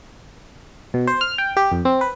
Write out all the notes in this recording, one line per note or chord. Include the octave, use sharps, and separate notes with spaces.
B2
C5
F6
G5
G4
F2
C4
B4